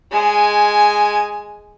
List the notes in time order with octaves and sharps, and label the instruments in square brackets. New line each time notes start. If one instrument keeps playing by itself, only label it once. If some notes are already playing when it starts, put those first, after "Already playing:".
[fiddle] G#3 G#5